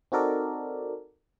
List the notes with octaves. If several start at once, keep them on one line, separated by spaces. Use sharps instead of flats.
C4 D#4 F#4 A4 A#4 D5